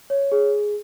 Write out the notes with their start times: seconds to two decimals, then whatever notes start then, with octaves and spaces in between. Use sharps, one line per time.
0.10 C#5
0.32 G#4